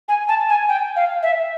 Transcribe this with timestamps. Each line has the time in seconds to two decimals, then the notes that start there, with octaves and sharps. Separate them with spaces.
0.08 G#5
0.28 A5
0.49 G#5
0.69 G5
0.96 F5
1.23 E5